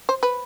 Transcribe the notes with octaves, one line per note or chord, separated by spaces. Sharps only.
C5
B4